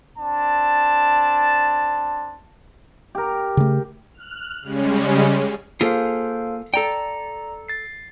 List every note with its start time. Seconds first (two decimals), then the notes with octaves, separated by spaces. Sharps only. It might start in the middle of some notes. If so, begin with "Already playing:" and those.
0.18 C4 D4 A5
3.15 G4 A#4
3.57 C#3 A3
4.14 F6 F#6
4.62 C#3 G3 G#3 C#4
5.81 A#3 F4 G#4 A4 C5 F5
6.74 A4 D5 G5 A#5
7.68 A6 C7